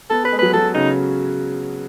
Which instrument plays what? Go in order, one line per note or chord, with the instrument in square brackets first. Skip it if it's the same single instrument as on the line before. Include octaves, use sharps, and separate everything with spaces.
[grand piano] B3 B4 [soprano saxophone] A4
[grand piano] A4 [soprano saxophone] B4
[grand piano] G#3 G#4
[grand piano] F#3 F#4 [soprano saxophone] B4
[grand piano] F#3 F#4 [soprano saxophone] A4
[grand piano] C#3 C#4 [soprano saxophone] D#4